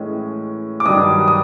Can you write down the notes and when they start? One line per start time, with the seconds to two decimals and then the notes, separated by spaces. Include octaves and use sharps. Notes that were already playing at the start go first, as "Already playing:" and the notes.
Already playing: A2 E3 G#3 C#4
0.80 D6
0.86 G2 D#3 F#3 D#6
1.28 D#6